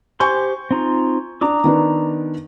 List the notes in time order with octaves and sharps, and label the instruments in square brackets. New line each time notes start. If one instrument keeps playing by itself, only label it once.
[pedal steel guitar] G4 C5 C6 [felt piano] G#5 C#6 G6
[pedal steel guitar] C4 D#4 F4
[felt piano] D4 [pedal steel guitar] A#5 D6 D#6
[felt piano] D#3 B3 D4